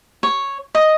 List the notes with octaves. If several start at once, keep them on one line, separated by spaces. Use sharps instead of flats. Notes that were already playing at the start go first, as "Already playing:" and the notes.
C#5
D#5